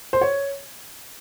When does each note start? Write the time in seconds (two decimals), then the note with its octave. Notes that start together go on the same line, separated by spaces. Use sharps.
0.13 C5
0.21 C#5